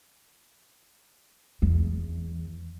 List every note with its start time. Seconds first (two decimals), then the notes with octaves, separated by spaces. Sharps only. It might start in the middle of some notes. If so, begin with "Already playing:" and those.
1.62 E2